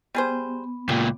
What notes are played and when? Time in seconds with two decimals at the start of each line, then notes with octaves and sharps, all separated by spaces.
0.15 G3 B3 G#4 C5
0.89 C#2 A#2 G4